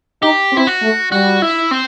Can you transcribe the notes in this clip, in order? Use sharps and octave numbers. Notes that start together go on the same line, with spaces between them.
D#4 G4
C4
E4
F#4
A3
G3 F#4
E4
C4